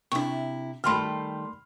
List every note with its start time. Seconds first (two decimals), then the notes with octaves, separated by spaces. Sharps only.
0.12 C3 D4 E4 C#6
0.84 D#3 G3 A3 B5 C6 F6